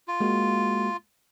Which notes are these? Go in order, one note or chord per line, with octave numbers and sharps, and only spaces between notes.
F4
G#3 A#3 F#4